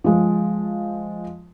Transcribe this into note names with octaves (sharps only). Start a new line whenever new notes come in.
F3 G#3